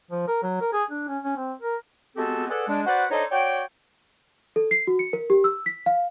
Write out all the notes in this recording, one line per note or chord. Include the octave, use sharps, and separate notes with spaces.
F3
A#4
F#3
A#4
G#4
D4
C#4
C#4
C4
A#4
G#3 B3 C4 F#4 G4 A4
G#4 A4 B4 D5 F#5
G#3 D4
F#4 B4 C5 D5 F#5
D4 D#4 A4 C5 C#5 D#5
F#4 C#5 D5 G5
A4
C7
F#4
C#7
A#4
G4
E6
B6
F5